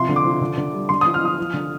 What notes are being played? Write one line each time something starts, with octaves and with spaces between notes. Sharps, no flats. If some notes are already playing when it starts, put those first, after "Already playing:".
Already playing: C3 F3 C6
D3
D6
F3
D3
D3
G3
D3 C6
D#6
F3
F6
F3 D#6
F3
D3